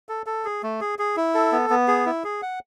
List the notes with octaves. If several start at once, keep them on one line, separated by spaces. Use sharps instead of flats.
A4
A4
G#4
A3
G#4
G#4
E4
A4
B3
B3
G#4
E4
G#4
F#5